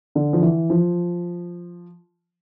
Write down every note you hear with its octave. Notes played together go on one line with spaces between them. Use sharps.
D3
F3
E3
F3